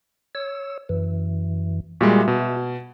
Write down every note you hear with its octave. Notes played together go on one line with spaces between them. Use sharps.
C#5 E6
F#2 E3
A#2 G3 G#3 F#4 E5
B2